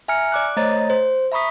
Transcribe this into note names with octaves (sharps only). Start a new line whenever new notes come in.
E5 G#5 A#5 F6 C#7
D5 D6 F#6
A3 C5 C#5 D#5 A#5 A6
C5
E5 A#5 B5 C#6 D#6 B6